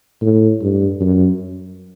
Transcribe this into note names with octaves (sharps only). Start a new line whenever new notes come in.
A2
G2
F#2